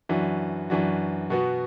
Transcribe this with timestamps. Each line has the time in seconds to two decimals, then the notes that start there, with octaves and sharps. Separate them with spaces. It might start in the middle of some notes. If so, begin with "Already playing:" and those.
0.09 F#2 E3 D4 F#4
0.70 F#2 E3 D4 F#4
1.30 B2 B3 F#4